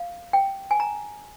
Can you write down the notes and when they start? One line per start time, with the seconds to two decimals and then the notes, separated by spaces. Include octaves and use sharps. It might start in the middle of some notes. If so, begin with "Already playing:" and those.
Already playing: F5
0.33 G5
0.71 G#5
0.80 A#5